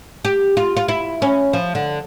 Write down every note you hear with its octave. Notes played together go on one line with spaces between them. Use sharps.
G4
F4
F4
E4
C#4
F3
D3